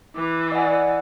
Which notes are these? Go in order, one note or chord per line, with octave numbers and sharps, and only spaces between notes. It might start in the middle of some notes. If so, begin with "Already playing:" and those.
E3 D6
D5 D#5 F#5 G#5